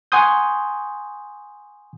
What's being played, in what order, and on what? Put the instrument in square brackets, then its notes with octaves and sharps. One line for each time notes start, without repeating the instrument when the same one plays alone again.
[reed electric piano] F#5 G#5 C6 C#6 D#6 G6